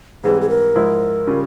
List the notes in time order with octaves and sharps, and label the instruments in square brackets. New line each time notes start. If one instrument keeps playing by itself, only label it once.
[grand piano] G#2 E3 G3 C4 [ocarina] G#4
[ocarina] G#4
A#4
[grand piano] G#2 F3 G#3 E4
C#3 G3 C#4 F4